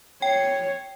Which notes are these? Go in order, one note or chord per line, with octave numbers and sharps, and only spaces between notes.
C#5 G5